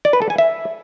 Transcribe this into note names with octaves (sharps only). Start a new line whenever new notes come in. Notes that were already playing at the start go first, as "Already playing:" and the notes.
D5
B4
A4
G#5
E5